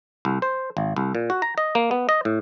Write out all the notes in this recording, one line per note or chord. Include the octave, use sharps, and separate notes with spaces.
C2
C5
G#1
C2
A#2
F#4
A#5
D#5
A#3
B3
D#5
A2